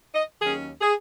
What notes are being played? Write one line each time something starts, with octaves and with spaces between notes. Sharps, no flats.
D#5
D#2 D#3 F#3 C#4 G#4
G#4